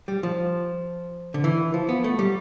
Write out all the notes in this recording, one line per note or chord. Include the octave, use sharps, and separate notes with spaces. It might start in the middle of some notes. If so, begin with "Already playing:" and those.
G3
F3
D3
E3
F3
B3
A3
G3